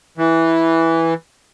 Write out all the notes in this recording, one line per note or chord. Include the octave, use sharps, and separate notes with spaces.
E3